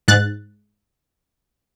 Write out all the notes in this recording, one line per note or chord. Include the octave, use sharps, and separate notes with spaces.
G#2 F#6 A6